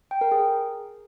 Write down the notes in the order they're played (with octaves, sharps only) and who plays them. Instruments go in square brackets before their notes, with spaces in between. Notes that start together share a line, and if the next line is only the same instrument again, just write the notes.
[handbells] G5
A#4
G#4